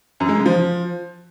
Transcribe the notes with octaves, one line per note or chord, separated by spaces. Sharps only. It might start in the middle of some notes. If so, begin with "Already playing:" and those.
F#2
G#3
C#3
F3